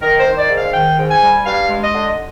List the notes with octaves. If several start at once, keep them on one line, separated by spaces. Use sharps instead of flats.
D#3 A#4
C5
D#3
D5
G#2
F5
D#3 G5
G#2
G#5
G3
G2 F5
G#3
D#5
D3